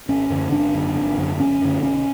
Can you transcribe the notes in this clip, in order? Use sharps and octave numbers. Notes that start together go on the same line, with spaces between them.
G#1 C#4
F#2 D3
G#1 D4
F#2 D3
G#1
F#2 D3
G#1 C#4
F#2 D3
B1 C#4